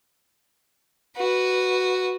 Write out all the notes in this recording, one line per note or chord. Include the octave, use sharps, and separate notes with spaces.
F#4 B4